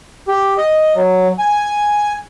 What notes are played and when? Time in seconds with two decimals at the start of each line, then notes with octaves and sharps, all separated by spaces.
0.28 G4
0.57 D#5
0.95 F#3
1.39 G#5